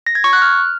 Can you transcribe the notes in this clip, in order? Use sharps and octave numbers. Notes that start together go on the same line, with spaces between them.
A#6
G#6
C#6
F#6
F6